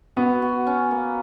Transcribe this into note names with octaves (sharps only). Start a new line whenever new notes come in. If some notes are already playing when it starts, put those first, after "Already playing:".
B3 F#4
F#4
C#4
A#3